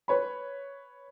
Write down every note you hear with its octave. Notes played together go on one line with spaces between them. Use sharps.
B4 C#5 B5